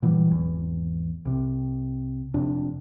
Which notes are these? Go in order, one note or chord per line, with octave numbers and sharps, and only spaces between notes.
A#2 E3 F#3 G3
G#1 E2
C2 C3
F1 F2 C3 D4